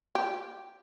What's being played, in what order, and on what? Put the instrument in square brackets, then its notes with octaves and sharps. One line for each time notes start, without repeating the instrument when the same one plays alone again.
[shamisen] G4